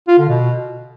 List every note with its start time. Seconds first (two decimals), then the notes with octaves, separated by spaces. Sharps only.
0.08 F4
0.18 D3
0.29 B2